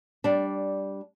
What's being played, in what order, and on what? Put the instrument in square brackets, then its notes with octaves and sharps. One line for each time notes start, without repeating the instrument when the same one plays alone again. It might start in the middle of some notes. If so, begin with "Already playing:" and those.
[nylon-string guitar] G3 D4